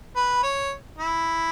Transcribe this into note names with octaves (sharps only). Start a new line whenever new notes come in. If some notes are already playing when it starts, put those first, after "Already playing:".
B4
C#5
E4